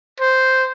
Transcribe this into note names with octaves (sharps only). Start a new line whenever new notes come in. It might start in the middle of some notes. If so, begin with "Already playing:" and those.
C5